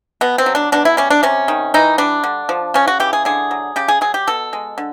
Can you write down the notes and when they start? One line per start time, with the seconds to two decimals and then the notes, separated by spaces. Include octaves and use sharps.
0.21 B2 B3
0.38 C4
0.46 F#3
0.55 D4
0.72 B2 D4
0.85 E4
0.97 G3 C#4
1.10 D4
1.23 C3 C#4
1.48 D#3
1.74 E3 D#4
1.98 G3 D4
2.24 D3
2.49 F3
2.74 C#3 C#4
2.87 F#4
3.00 E3 G4
3.13 G#4
3.25 D3 G#4
3.51 F#3
3.76 C#3 G4
3.88 G#4
4.01 F#3 G#4
4.14 G4
4.27 B2 A4
4.53 G#3
4.78 D3